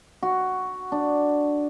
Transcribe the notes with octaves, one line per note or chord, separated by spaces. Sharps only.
F#4
D4